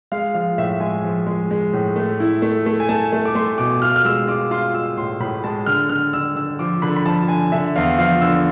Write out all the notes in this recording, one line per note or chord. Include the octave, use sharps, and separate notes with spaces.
G#3 F5
F3 F5
A2 E5
G#3 G#5
F3
G#3
G#3
A2
A3
E4
A3
A3
G#5
A3 A5
A3
D6
A3 C6
B2 D6
F4 F6
F6
G#3 E6
F4 D6
F4 C6
F4 E6
A2 C6
A2 B5
G#3 A5
D3 F6
D3 F6
D3 E6
D3 E6
F3 D6
D3 B5
B5
F3 A5
D3 G#5
D3 E5
E2 F5
F3 F5
D3 E6